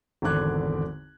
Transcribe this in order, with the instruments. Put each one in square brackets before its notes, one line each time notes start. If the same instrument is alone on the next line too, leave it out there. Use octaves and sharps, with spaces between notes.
[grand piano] G#1 E2 D3 D6 F#6 G#6